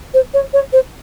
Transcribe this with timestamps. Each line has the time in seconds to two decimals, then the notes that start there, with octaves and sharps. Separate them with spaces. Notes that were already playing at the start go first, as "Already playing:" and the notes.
0.14 C5
0.34 C#5
0.53 C#5
0.72 C5